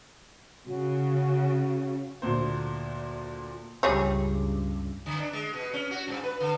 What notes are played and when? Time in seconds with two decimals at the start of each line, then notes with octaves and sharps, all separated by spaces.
0.67 C#3 F#4
2.22 D2 A#2 C5
3.83 C#2 G2 G3 G#4 C#5
5.06 D3
5.19 D4
5.33 G#3
5.53 B2
5.73 C#4
5.91 F#4
6.07 G2
6.24 B4
6.40 D3